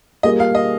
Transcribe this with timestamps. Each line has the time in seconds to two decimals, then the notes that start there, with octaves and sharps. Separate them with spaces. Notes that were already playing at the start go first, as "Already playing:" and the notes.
0.23 G3 A#3 F4 G#4 D#5
0.40 F5
0.55 D#5